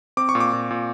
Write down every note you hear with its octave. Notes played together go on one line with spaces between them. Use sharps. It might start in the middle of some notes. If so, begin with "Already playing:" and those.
C4 D6
C#6
A#2
D6
A#2
A#2